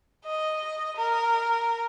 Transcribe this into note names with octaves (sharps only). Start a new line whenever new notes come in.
D#5
A#4